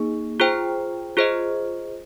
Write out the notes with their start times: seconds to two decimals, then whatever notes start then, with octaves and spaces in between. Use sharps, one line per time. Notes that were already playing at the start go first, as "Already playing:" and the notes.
Already playing: A#3 D#4 G#4
0.40 F4 G#4 C5 G5
1.17 F4 G#4 C5 D#5